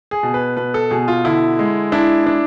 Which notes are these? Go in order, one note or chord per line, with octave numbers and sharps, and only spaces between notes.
G#4
B2
B4
B2 B4
A4
B2 G#4
F4
D3 E4
G#3
D4 E4
D4